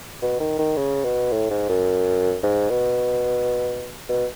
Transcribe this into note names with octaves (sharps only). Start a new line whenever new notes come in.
B2
D#3
D#3
C#3
B2
A2
G#2
F#2
G#2
B2
B2